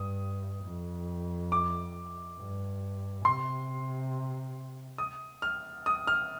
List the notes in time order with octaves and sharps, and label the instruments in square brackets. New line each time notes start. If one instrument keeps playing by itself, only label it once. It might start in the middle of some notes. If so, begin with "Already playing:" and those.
Already playing: [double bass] G2 [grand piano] D#6
[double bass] F2
[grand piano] D6
[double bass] G2
[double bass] C3 [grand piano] C6
[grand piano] D#6
F6
D#6
F6